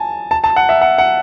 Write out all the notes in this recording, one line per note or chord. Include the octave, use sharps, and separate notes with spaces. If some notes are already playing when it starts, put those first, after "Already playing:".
Already playing: G#5 A5
A5
A5
F#5
E5
F#5
F#5